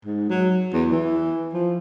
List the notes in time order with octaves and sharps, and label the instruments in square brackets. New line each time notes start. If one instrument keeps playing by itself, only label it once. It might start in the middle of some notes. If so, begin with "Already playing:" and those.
[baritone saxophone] G#2
F#3
E2
E3
F3